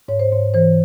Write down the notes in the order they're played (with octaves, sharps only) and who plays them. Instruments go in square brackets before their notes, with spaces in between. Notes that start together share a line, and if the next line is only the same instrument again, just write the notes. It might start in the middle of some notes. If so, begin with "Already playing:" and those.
[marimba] G#2 C#5
C5
G#2 C#5
E3 C5